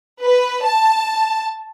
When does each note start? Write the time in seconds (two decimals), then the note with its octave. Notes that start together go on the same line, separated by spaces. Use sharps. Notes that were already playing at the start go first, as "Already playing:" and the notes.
0.22 B4
0.65 A5